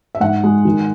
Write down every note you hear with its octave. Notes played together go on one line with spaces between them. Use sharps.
E5
G#2 F#5
G#3
D#3